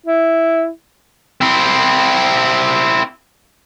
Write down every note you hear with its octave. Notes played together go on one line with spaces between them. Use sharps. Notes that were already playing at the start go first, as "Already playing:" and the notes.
E4
C4 E4